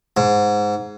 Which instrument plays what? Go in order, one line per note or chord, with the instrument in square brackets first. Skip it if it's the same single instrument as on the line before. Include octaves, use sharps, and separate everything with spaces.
[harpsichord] G#2